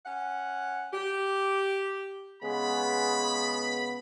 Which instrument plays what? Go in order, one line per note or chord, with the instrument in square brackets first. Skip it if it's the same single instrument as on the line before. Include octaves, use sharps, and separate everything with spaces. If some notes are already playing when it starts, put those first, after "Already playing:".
[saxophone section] C#4 F#5
G4
[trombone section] C#3 G#3 B3 [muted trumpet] B5